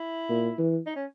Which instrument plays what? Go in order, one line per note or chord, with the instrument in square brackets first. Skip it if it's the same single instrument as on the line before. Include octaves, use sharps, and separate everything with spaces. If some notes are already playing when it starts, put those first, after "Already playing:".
Already playing: [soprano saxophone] E4
[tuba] A#2
E3
[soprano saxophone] D#4
C#4